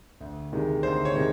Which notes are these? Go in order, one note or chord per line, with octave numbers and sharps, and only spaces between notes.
D2
C3 D#3 G#3
D2 C5
C#5
C3 D#3 G#3